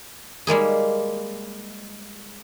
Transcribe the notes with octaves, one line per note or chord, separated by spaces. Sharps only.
G3 G#3 A#3 G#4